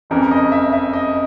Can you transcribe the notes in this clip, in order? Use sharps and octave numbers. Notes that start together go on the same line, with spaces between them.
F#1 F2 C#3 E3 A#4
D#5
E5
E5
D#5